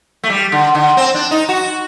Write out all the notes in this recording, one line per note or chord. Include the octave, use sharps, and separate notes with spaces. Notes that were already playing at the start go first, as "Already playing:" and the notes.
A3
G3
D3
D3
C4
D4
D#4
F#4